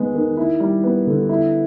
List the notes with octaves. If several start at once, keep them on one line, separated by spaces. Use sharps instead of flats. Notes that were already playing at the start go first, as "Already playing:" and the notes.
Already playing: D#3 G#3 B3
D#3
E4
G3
B3
D3
E4